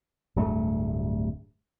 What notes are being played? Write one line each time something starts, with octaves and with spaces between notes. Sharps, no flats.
D1 D2 G2 A3